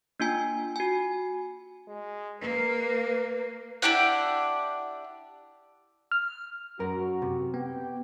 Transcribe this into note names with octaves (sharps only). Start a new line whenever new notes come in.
A#3 D4 F4 G#5
F#4 G#5
G#3
A#3 A#4 B4
D4 E4 G4 F#5
F6
F#2 F#4 A#4
C3
B3 G4 G5